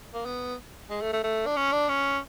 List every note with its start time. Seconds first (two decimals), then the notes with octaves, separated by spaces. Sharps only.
0.14 A#3
0.25 B3
0.90 G#3
1.01 A3
1.13 A3
1.23 A3
1.46 D4
1.56 C#4
1.72 D4
1.89 C#4